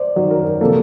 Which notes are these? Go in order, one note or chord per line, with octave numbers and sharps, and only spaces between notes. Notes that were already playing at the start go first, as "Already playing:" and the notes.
Already playing: C5 D5
F#2 D#3 F#3
A#4
A#4
C3 F3 A#3 A4